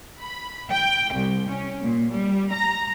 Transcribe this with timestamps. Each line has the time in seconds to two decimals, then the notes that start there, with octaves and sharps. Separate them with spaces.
0.20 B5
0.70 G5
1.13 C2
1.48 C#4
1.83 A#2
2.13 G3
2.53 A#5